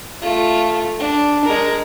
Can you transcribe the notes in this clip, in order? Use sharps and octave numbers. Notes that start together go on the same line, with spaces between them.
A3 F4
D4
G#3 A#4